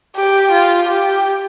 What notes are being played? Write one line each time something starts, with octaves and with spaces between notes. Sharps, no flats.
G4
F4
G4